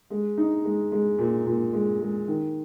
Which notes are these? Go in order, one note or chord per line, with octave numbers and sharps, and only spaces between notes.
G#3
D#4
G#3
G#3
A#2
A#2
G#3
G#3
D#3